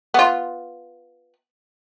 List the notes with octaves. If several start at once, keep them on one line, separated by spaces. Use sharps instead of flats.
B3 F4